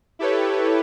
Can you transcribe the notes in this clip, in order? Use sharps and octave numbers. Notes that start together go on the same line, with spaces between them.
E4 G4 A4 B4 C#5